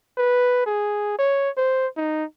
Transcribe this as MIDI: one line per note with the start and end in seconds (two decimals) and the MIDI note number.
0.18 0.65 71
0.66 1.14 68
1.19 1.50 73
1.57 1.87 72
1.97 2.24 63